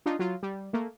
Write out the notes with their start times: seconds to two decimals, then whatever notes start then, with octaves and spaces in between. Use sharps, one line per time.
0.06 D4 D#4 F4
0.19 F#3 F4
0.43 G3
0.73 A3 A#3